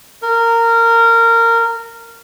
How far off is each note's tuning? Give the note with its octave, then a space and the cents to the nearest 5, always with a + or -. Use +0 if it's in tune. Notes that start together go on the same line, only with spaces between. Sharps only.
A#4 -20